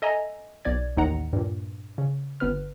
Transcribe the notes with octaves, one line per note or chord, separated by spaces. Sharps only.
A4 D#5 E5 G#5 A#5
B1 B3 D5 G#6
A1 D#2 D#4 F#5 A#5
G2 A#2
C#3
G1 B3 B4 F6